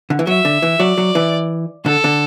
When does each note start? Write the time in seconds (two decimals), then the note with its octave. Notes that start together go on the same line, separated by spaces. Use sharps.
0.10 D3
0.19 E3
0.27 F#3 E5
0.45 D3
0.62 E3
0.79 F#3 D5
0.98 F#3
1.15 E3
1.86 D3 A4
2.04 D3